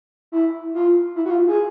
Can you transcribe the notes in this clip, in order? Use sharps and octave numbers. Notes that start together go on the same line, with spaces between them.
E4
F4
E4
F#4
F4
G#4